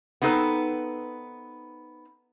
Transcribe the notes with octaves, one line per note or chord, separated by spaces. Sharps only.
B3 C4 D#4 A4 B4